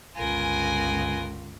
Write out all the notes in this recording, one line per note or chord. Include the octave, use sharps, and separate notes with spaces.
G1 C#2 F4 A#4 B4 G#5